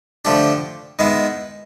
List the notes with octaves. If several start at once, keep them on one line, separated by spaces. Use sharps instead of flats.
D3 F3 A3 D4 G4
D#3 G#3 B3 E4